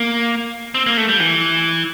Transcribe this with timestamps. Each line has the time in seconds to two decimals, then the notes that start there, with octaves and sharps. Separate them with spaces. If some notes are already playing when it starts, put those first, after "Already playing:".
Already playing: A#3
0.74 C4
0.86 A#3
0.97 A3
1.09 G3
1.20 E3